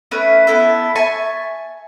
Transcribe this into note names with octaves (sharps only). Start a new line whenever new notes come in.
A3 C#4 E4 B4
B3 E4 A4
E5 G#5 A5 C#6